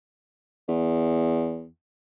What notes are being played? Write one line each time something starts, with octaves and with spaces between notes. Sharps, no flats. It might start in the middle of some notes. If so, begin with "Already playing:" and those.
E2